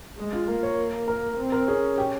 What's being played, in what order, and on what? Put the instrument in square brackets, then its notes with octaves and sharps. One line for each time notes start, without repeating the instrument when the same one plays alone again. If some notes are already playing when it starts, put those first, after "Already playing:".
[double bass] G#3
[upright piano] F4
[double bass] A#3
[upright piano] C#5
A#4
[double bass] C4
[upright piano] A#4
[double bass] C#4 [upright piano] G#4
[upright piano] G4